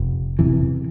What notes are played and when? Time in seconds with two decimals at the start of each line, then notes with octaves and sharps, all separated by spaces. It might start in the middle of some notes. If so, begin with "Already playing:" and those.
Already playing: F1
0.39 E2 C3 E3